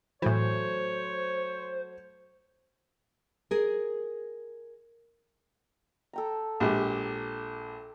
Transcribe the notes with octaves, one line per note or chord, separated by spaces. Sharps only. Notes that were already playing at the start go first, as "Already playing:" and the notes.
A2 E3 F#3 A3 C5 C#5
G#4 A#4
A4 G5 A#5
A#1 G#3 G4